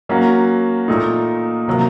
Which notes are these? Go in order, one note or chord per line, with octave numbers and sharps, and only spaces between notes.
F#3 A#3 C#4 F#4
A#2 A3 D#4
C3 F#3 A#3